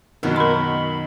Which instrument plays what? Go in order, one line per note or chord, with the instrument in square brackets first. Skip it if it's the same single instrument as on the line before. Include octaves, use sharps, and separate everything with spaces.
[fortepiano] F#2 B2 F#3 [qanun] D#3 F#4
[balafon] A#4 C6 [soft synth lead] B5